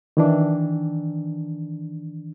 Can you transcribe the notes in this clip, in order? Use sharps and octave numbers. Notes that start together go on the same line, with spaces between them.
D#3 E3 D4